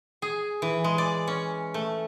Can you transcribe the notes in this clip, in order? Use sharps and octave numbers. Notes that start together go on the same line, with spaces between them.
G#4
E3
G#3
D5
C#4
A3